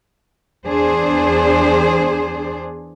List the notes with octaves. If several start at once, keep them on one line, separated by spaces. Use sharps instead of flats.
E2 D4 G#4 C5